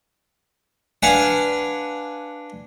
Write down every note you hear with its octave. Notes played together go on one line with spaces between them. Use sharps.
D4 B4 F5 F#5 G#5